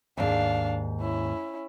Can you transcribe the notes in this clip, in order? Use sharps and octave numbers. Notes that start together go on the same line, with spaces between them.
D#2 G#2 D4 F5
C#4 E4